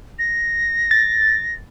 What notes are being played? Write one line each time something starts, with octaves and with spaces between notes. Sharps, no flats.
A#6
A6